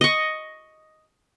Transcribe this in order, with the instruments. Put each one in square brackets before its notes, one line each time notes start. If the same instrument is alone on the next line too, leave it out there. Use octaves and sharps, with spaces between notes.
[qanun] D#5 C#6